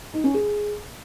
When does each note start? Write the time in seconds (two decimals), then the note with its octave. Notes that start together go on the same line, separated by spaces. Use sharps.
0.14 D#4
0.24 C#4
0.34 G#4